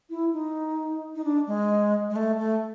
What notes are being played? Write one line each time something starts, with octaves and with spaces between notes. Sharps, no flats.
E4
D#4
D#4
D4
G#3
G#3
A3
A3